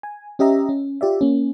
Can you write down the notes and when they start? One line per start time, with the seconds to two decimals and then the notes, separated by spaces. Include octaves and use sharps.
0.03 G#5
0.39 C#4 G4 D#5 E5 A#5
0.69 C#4
1.01 F4 G4 D5 E5
1.21 A#3 C#4